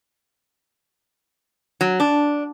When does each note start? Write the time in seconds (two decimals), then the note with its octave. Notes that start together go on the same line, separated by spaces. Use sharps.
1.81 F#3
2.00 D4